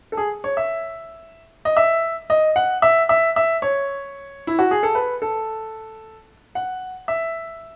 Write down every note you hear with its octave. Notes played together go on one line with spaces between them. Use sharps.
A4
G#4
C#5
E5
D#5
E5
D#5
F#5
E5
E5
E5
C#5
E4
F#4
G#4
A4
B4
A4
F#5
E5